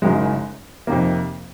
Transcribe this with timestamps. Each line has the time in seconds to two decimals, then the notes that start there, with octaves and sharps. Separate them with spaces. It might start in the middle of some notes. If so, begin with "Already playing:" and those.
0.02 F#1 F#2 D#3 G#3
0.87 F2 C3 D#3 A#3